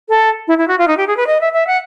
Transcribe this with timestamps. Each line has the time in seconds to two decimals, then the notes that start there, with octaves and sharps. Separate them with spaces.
0.09 A4
0.47 E4
0.58 E4
0.68 F#4
0.78 F4
0.87 D#4
0.97 G4
1.07 G#4
1.17 B4
1.27 D#5
1.41 E5
1.53 E5
1.67 F#5